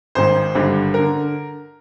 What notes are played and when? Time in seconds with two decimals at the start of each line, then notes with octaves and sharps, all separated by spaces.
0.15 G#1 G#2 D#3 C5
0.55 G#1 G2 D3
0.94 D3 A#4